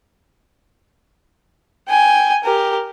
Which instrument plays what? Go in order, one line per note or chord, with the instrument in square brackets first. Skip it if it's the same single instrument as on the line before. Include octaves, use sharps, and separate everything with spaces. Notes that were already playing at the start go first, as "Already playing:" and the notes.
[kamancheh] G5 G#5
G4 A#4